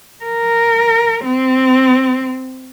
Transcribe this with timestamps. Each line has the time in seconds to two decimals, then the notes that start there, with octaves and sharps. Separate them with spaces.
0.24 A#4
1.25 C4